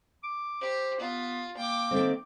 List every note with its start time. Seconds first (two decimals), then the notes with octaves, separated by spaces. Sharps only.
0.23 D6
0.62 G4 C5
1.00 B3 F4
1.57 A#3 G5 D6
1.91 D#3 A3 C4